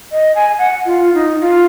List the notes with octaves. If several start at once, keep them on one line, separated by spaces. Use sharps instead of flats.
D#5
G#5
F#5
F4
D#4
F4